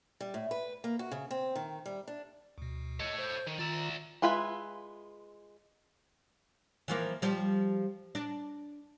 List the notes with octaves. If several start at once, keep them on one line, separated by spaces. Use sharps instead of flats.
G3
A2
B4
A#3
F#4
C#3
C4
D#3
G3
D4
D2 B2
A4 C#5 D#5
C5 G6
D#3
D#3 F4 D5 E5 A#5
G#3 F4 B4 E5 G#5
E3 F3 A#3
F3 G3
D4